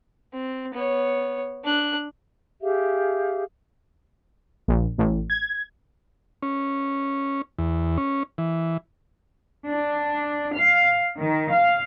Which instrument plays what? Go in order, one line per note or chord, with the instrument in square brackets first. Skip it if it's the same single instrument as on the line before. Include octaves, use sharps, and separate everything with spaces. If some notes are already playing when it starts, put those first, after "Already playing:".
[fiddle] C4
B3 C#5
D4 F#6
[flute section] G4 G#4 E5 F5
[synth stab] A#1
A1
G#6
[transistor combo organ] C#4
E2
C#4
E3
[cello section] D4
F5
D#3
F5